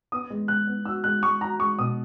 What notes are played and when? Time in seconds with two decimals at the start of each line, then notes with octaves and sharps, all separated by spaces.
0.12 B3 D#6
0.30 G#3
0.48 G#3 F#6
0.67 B3
0.85 F#4 E6
1.04 G#3 F#6
1.23 G#3 C#6
1.41 F#4 A#5
1.59 G#3 C#6
1.79 B2 D#6